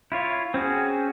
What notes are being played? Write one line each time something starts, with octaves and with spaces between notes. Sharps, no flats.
E4 F4 C#5
C4 C#4 F#4 G#4